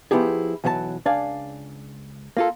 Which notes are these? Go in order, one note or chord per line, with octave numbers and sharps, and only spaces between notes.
F3 B3 E4 G4 G#4
B1 E3 F#3 C5 A5
C#2 D4 D5 F5 G#5
A#3 F4 A4